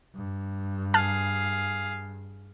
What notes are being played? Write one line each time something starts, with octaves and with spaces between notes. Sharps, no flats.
G2
G#4 F5 A5 F6 F#6